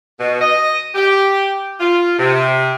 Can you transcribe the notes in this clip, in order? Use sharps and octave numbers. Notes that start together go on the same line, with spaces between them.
B2
D#5
G4
F4
C3